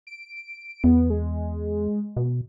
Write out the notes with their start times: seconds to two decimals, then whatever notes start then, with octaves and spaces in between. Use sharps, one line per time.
0.07 D7
0.84 E2 B3
1.10 G#3
2.16 B2